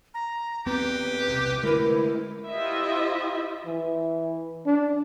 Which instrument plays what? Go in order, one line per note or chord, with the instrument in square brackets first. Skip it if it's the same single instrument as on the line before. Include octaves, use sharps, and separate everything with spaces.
[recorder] A#5
[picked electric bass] D#2 B3 C4 [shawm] G4 [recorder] B4
[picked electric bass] B1 C3
[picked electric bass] D3 G#3 A3 [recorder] E4 [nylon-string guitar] A#4 B4
[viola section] E4 F4 G4 C5 D#5 E5
[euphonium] E3
D4